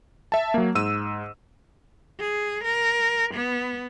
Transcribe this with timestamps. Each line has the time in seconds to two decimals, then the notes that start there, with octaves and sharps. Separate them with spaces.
0.32 E5 A5
0.54 F#3 A#3
0.75 G#2 E6 D#7
2.20 G#4
2.64 A#4
3.34 B3